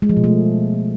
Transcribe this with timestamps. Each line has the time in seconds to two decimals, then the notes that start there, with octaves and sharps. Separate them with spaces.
0.02 G#3
0.09 F3
0.17 B2
0.24 A3